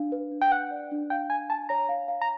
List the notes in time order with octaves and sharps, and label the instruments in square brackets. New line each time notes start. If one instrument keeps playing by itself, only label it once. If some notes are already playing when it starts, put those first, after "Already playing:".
Already playing: [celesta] D4 F5
B4
D4
[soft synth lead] G5
[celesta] B4 [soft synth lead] F#5
[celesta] D5
D4
[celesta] F5 [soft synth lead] G5
[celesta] F5 [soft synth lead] G#5
[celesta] G#5 [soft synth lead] A5
[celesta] C#5 [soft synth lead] A#5
[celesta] F5
F5
[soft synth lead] A#5